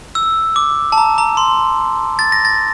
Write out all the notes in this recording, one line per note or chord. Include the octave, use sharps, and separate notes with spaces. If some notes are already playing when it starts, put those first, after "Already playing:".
E6
D6
A5
A#5
A#5
C6
A6
A#6
A6